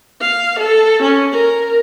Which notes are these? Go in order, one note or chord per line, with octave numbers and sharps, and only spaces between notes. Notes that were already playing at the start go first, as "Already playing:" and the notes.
F5
A4
C#4
A#4